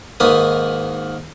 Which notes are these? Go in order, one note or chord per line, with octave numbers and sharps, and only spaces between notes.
G#2 D#3 A#3 B4 D#6